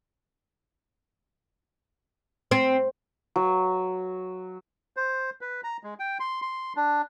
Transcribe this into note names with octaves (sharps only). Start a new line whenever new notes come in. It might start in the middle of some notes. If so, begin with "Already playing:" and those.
C4
F#3
C5
B4
A#5
G#3
G5
C6
C6
D4